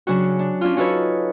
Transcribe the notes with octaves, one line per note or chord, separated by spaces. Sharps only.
C#3 F#3 D4 F#4
D4
C#4 D4 F4
C#4 D#4 F#4 A4 B4 C#5